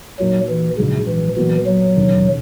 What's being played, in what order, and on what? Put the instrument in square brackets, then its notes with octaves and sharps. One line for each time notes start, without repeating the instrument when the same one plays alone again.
[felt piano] A#2 A#3 D#4 F#4 A#4 [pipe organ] F#3
[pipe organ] E3
[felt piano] A#1 G#2 F#3 [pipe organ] C#3
[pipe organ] E3
[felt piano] A#2 F#3 B3 F#4 [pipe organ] E3
[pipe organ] F#3
[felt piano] E1 D#2 C#3